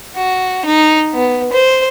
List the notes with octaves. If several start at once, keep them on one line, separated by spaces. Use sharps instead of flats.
F#4
D#4
B3
C5